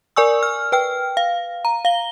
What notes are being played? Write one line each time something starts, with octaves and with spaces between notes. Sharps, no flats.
A#4 D5 G#5 C#6 E6
F6
B4 G5 F6
F5
A#5
F5 G7